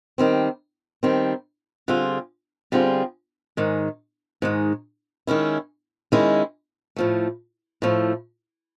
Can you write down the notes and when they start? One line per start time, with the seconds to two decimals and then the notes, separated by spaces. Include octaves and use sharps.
0.18 D#3 G3 C4
1.03 D#3 G3 C4
1.88 D3 G3 C4 F4 G#4
2.72 D3 G3 C4 F4 G#4
3.57 G#2 D#3 G#3
4.42 G#2 D#3 G#3
5.27 D#3 G#3 C#4 E4
6.12 D#3 G#3 C#4 E4
6.96 A2 F3 A3
7.82 A2 F3 A3